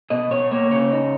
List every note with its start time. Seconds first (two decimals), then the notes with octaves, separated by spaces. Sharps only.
0.10 B2 D#5
0.31 B2 C#5
0.51 A#3 C#5
0.71 C#3 C#5
0.91 D#4